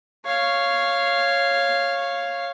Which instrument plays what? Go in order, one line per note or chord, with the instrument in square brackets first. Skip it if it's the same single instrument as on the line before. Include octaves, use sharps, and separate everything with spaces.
[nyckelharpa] C#5 F5